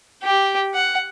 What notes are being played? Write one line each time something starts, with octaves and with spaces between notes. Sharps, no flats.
G4
F#5